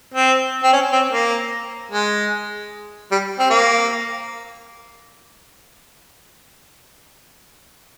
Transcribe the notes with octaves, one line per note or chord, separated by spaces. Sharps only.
C4
C4
C#4
C4
A#3
G#3
G3
C4
A#3